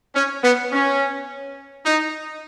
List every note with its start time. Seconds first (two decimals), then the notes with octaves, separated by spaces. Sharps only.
0.15 C#4
0.43 B3
0.73 C#4
1.85 D#4